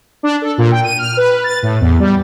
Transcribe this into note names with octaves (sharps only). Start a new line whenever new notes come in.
D4
A4
A#2
G5
D#7
F6
B4
A6
A2
E2
G3